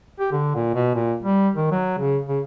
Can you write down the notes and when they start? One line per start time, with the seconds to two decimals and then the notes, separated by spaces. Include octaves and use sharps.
0.19 G4
0.32 D3
0.55 A#2
0.75 B2
0.95 A#2
1.22 G3
1.56 D#3
1.71 F#3
1.98 C#3
2.28 C#3